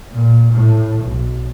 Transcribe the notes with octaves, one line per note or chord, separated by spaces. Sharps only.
A#2
A2
B1